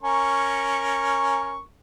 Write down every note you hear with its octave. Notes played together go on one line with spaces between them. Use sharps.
C#4 A#4 C#6